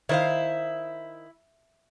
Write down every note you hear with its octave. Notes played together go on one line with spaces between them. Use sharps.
D#3 E4 C5 F5